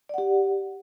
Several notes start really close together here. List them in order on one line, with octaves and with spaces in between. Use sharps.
D5 F#5 G4